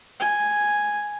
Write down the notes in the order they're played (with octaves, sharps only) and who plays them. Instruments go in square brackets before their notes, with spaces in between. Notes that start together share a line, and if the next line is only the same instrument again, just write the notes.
[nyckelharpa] G#5